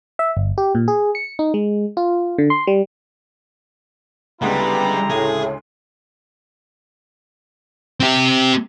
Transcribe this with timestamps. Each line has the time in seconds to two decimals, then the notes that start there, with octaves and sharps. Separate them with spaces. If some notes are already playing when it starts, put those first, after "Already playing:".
0.19 E5
0.37 G1
0.58 G4
0.75 A#2
0.88 G#4
1.15 C#7
1.39 D#4
1.54 G#3
1.97 F4
2.38 D3
2.50 C6
2.67 G3
4.42 D2 C#3 G3 G#3 B3 E4 G4 A#5
5.10 A2 G#4
8.00 C4 G4